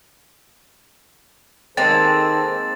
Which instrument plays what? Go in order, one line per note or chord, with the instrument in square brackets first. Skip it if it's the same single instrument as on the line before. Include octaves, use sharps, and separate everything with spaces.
[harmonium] D#3 A4 C5 [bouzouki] G#3 A#3 C4 [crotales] A6